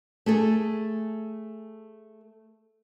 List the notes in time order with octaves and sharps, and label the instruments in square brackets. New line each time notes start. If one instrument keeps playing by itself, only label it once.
[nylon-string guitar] A3 G#4 A4